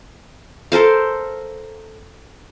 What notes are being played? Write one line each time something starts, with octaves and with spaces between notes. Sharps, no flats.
A4 A#4 C5 F5